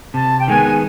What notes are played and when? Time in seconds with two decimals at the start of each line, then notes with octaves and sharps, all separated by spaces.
0.14 C3 A5
0.39 G5
0.48 D#3 G#3 B3 G#5